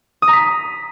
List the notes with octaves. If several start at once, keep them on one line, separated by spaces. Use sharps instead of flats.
D#6
A#5
B6